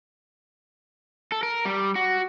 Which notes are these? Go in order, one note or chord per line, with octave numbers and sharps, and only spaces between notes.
A4
A#4
G3
F#4